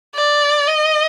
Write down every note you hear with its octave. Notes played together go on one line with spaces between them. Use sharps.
D5
D#5